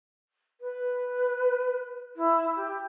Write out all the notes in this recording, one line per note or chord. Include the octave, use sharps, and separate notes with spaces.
B4
E4
G4